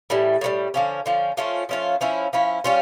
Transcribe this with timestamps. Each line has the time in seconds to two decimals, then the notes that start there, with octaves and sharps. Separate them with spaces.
0.10 A2 E3 G3
0.41 A2 E3 G3
0.74 D3 F3 C#4
1.06 D3 F3 C#4
1.37 F3 A3 C#4 F4
1.69 F3 A3 C#4 F4
2.01 F3 C#4 E4
2.33 F3 C#4 E4
2.64 G3 C#4 F4